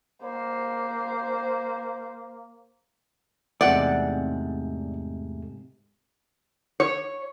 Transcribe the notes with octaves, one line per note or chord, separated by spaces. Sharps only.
A#3 C5
E2 G#2 C3 G#3 A3 D5 F#5
C#5